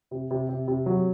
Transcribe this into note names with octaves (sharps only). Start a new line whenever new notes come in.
C3
C3
C3
C3
F#3